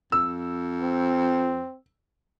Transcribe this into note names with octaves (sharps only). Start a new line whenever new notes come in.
F2 E6
C4